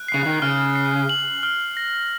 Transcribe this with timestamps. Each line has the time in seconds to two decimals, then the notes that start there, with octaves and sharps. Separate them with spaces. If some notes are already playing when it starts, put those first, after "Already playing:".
Already playing: F#6
0.08 C7
0.14 C#3
0.25 D#3
0.42 C#3 F6
0.75 C7
1.09 F#7
1.43 F6
1.77 A#6